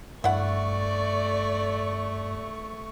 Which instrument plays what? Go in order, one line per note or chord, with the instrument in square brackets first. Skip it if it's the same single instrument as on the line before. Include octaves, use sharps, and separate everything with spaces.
[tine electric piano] G2 [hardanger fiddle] A3 C#6 [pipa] E4 F#5 [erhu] D5